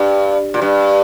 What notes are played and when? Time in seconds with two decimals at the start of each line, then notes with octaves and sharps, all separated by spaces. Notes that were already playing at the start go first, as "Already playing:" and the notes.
Already playing: G2
0.54 A#2
0.62 G2